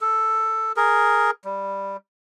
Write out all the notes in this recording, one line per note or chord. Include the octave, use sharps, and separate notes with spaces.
A4
G#4 A#4
G3